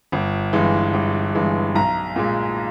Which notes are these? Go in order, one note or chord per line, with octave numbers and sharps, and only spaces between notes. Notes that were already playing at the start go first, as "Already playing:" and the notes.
G1
G2 E3 G#3
G1
G2 E3 G#3
B1 A#5
A#2 G#3